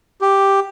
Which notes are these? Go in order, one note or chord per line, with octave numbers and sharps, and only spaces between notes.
G4